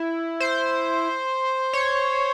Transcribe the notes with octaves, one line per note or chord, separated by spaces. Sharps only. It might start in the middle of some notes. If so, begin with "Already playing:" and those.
Already playing: E4
C5
C#5